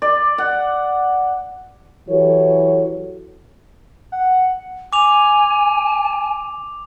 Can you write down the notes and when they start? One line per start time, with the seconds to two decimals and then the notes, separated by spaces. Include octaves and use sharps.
0.02 D5
0.38 F#5
2.09 E3 F#3 F#4 G4 A4 C#5
4.12 F#5
4.93 G#5 D6 F7